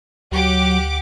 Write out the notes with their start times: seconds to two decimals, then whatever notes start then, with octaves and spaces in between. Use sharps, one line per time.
0.32 D2 F#3 G4 F#5 D6